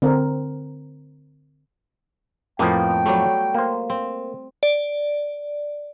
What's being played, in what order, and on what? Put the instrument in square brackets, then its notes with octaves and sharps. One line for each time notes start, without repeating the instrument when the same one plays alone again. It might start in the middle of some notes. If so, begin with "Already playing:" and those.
[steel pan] D3 C4 A#4
[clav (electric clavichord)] F2 A2 F3 [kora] A#3 B3 [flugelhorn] G5
[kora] F#3 G3 A3
[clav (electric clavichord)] A#3 C5
[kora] C4
[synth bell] D5